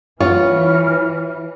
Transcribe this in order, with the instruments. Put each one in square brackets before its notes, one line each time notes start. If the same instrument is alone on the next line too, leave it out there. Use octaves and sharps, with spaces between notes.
[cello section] E3 [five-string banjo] F4 F#4 [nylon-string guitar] C#5 [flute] F6